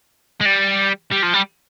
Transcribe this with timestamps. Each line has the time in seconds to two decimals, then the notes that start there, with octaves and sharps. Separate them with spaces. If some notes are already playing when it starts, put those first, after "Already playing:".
0.41 G#3
0.45 G3
1.12 G3
1.23 F3
1.34 G3